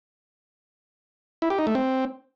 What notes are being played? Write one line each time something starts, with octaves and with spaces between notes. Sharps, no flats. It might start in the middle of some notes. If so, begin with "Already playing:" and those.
E4
G4
D#4
A3
C4